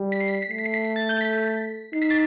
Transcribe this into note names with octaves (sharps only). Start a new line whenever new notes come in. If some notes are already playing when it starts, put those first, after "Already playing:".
Already playing: G3
B6
C7
B6
C7
B6
A3 C7
B6
C7
B6
B6
A6
G6
B6
D#4 C7
B6
A6